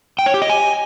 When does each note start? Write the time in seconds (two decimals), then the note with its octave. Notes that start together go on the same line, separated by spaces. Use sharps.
0.19 G5
0.26 C#5
0.34 G4
0.42 D#5
0.49 G#5